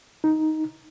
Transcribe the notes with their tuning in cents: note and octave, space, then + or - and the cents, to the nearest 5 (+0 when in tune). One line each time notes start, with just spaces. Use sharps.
D#4 +5